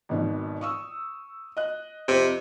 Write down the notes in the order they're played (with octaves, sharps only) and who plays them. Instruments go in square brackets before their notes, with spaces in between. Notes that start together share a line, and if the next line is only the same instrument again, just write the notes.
[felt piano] G#1 B2 D#3
C#6 D#6 E6
D#5 F#6
[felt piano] F2 [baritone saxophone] C3